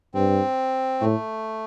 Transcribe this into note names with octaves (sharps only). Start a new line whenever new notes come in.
G2 C4
A2 A3